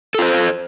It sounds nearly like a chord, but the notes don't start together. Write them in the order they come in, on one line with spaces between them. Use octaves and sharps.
A4 F4 C5